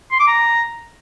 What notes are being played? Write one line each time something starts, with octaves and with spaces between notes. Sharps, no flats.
C6
D6
A#5